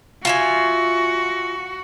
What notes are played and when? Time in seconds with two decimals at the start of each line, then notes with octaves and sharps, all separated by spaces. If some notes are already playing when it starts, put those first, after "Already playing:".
0.25 F4 F#4 E5 G#5